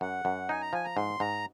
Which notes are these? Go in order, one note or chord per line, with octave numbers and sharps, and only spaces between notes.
F#2 F#5
F#2
D#4 G#5
A#5
F3 G#5
A#5
G#2 C6
G#2 A#5